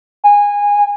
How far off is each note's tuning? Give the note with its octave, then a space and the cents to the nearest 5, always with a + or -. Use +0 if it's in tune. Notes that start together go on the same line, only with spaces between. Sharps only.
G#5 -20